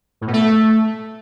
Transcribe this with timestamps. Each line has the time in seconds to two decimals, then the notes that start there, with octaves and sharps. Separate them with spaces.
0.21 A2
0.27 B2
0.33 A3